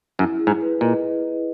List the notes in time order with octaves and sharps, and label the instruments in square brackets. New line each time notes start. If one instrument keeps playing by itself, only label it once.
[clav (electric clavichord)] F#2 [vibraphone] E4
[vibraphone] G#4
[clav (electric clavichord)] G#2
[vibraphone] B4
[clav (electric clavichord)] A#2 [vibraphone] D#5